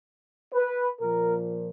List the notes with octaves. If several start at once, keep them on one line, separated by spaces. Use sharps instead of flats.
B4
A#2 F3 A#3 A#4